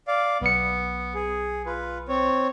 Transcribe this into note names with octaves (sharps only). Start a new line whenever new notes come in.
D5 F5
B1 B3 C#7
G#4
F4 B4
C4 C#5